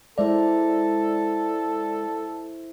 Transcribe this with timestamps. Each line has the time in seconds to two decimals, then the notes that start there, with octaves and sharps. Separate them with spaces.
0.18 G#3 E4 A4 C5 D5 E5